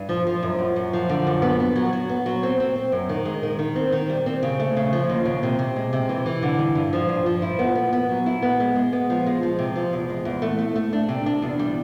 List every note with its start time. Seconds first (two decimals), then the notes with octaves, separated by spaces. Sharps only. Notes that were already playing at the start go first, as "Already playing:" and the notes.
Already playing: G2
0.09 F3
0.27 F3
0.43 F#2
0.59 F#2
0.76 F#2
0.93 F3
1.09 D3
1.27 F#2
1.42 B3
1.60 B3
1.76 F#3
1.93 F#3
2.09 B3
2.26 F#3
2.43 C4
2.60 C4
2.76 C4
2.92 F#2
3.09 D#3
3.25 G#3
3.43 D#3
3.59 D#3
3.76 C4
3.92 D#3
4.10 G3
4.26 C4
4.43 C#3
4.60 A3
4.77 C#3
4.93 F3
5.10 D#2
5.25 C#3
5.43 C3
5.59 C3
5.76 G#3
5.93 C3
6.09 E3
6.26 E3
6.42 D3
6.59 G2
6.75 G2
6.93 F3
7.09 G2
7.26 F3
7.42 E4
7.59 B3
7.75 B3
7.93 B3
8.09 F#3
8.26 E4
8.42 B3
8.60 G#3
8.76 G#3
8.93 B3
9.10 F3
9.27 G#3
9.43 F3
9.59 C3
9.76 F3
9.93 E2
10.09 G#3
10.25 E2
10.42 A3
10.59 A3
10.76 A3
10.93 D4
11.09 C3
11.26 D4
11.42 E2
11.59 G3